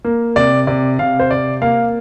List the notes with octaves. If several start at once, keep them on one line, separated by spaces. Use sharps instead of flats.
A#3
C3 D5
C3 D5
C3 F5
C5
C3 D5
A#3 F5